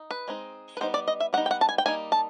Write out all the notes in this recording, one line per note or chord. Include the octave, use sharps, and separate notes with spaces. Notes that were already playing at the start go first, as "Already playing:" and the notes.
Already playing: D#4
B4
G#3 C4 D#4
B4
G3 B3 D#4 C5
D5
D#5
E5
G3 B3 D#4 F#5
G5
F#5
A5
G#5
G5
G3 A#3 D#4 G#5
A5